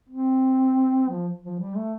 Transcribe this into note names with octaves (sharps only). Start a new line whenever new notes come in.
C4
F3
F3
G3
A3